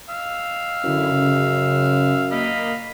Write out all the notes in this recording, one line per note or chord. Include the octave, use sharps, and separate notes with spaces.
F5 E6
F#2 D3 E4
C#3
A#3 D#5 F5 B5